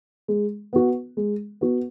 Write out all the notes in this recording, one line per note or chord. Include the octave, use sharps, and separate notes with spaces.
G#3
B3 F#4
G#3
B3 F#4